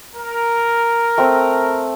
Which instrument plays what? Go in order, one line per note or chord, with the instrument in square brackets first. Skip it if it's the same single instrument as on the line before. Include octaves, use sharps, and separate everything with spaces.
[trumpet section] A#4
[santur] A3 C4